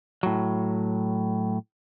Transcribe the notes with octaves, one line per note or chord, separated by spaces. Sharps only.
A2 F#3